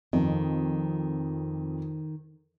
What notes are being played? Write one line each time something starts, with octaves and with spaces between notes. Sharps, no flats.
F2 D#3